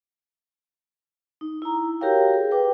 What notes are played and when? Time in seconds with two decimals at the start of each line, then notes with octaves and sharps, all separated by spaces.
1.41 D#4
1.62 E4 A#5
2.01 F#4 G4 A#4 C#5 F5 G5
2.34 G#4
2.51 B4 G5 D6